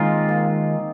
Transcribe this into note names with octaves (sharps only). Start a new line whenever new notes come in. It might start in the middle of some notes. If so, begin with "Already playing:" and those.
Already playing: D#3 G#3 A#3 C4 D#4 F4
A#3